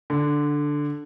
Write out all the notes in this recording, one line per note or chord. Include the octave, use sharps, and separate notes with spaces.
D3